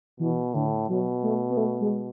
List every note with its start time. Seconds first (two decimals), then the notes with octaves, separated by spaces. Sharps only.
0.20 B2 E3
0.54 A2 D3
0.89 B2 F#3
1.23 A3
1.50 B3
1.57 A3
1.81 G#3